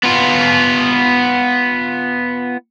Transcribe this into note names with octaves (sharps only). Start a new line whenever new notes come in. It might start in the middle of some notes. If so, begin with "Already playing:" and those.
B3 F4